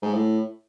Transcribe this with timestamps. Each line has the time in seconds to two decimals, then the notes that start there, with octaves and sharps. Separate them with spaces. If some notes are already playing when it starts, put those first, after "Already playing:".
0.02 G#2
0.14 A2